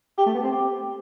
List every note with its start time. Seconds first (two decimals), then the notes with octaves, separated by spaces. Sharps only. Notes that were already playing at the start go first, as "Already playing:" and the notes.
0.18 G4
0.26 A3
0.35 B3
0.43 C4
0.51 G4